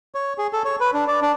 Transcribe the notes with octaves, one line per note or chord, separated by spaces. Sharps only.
C#5
G#4
A4
C#5
B4
D4
D5
D4